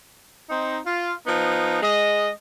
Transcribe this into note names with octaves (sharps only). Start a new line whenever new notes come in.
C4 D#4
F4
F3 B3 D#4
G#3 D#5